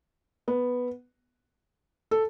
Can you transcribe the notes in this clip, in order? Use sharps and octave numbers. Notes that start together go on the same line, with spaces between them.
B3
A4